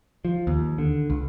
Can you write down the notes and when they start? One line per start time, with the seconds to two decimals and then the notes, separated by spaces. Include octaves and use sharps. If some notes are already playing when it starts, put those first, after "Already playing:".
0.25 F3
0.47 D#2
0.78 D3
1.10 C#2